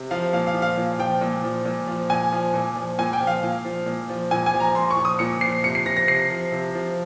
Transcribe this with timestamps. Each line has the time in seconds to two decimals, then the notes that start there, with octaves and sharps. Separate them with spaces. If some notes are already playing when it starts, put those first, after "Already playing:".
Already playing: C3
0.11 F3 F5
0.33 A#2 F5
0.47 F5
0.54 F3
0.62 F5
0.77 A#2
0.99 F3 G5
1.21 A#2
1.44 F3
1.65 A#2
1.88 F3
2.10 A#2 G#5
2.32 F3
2.54 A#2
2.76 F3
2.98 A#2 G#5
3.13 G5
3.21 F3
3.27 F5
3.43 A#2
3.65 F3
3.86 A#2
4.09 F3
4.31 A#2 G#5
4.46 G#5
4.53 F3
4.60 A#5
4.75 A#2 C6
4.91 C#6
4.97 F3
5.05 D#6
5.19 A#2 C#7
5.41 F3 C7
5.64 C3 C#7
5.75 C7
5.86 F3 A#6
5.97 A#6
6.08 C3 C7
6.30 F3
6.52 C3
6.75 F3